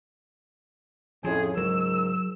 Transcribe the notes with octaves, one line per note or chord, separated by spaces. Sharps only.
F2 A2 F3 C#4 G#4
C#2 G#2 F#3 A#4 E6